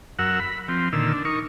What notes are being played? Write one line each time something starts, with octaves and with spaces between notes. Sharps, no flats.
F#2 A#4 F#5 E6
B5
F3 C4
A#2 D3 D#3 E6
D4
D#4 A#4 C#6